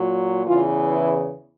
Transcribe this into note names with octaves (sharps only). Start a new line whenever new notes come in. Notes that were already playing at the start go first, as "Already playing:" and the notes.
Already playing: A#2 F#3
E2 C#3 E3 F4
E4